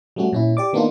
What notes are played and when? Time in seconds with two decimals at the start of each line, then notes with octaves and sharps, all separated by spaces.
0.16 F#3 G3 A3 C#4 F#4
0.33 A#2 C#4 E4
0.57 G4 D5 D6
0.73 D#3 A#3 B3 D4 D#4 F4